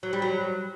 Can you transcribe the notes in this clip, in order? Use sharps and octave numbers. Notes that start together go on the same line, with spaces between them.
F#3
G3
F#3